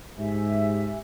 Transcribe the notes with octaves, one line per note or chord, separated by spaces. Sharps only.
G#2 G4 E5 G#5